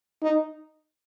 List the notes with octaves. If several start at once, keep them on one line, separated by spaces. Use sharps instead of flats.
D#4